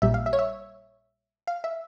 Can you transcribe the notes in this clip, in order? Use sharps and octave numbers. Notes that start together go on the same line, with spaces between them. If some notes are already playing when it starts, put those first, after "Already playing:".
A#1 A#2 G3 E5
F5
E5
C#5
E5
F5
E5